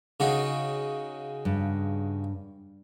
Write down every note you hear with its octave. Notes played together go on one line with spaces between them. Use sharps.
C#3 D#4 F#4
G2